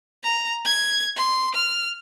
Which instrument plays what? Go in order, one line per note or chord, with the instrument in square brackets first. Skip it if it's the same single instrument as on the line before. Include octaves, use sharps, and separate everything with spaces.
[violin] A#5
G#6
C6
F6